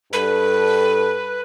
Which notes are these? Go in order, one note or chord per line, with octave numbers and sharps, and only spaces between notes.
G2 A4 B4